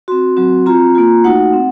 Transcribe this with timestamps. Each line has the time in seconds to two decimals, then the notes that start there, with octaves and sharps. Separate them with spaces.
0.08 C4 F#4 C6
0.37 F#3 C4 F#4
0.66 C4 F4 A#5
0.95 A#3 F4
1.24 A3 D#4 F#4 F#5
1.53 C4